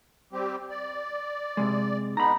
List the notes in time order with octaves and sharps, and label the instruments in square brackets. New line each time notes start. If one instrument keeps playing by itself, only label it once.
[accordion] G3 C4 G4
D5
[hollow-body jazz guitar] C3 G#3
[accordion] G#3 B3 D#4 [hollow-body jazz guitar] A#5 B5